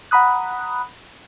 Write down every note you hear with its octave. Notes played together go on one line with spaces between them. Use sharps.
F#5 A#5 B5 D#6 F#6